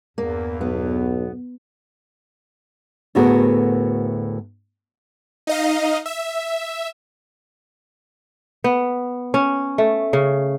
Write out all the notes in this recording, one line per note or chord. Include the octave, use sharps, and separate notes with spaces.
E2 G2 A#3
B1 B3
D2 A2 B3 F#4 G#4 A#4
D#4 D#5 F5
E5
B3
C#4
A3
C#3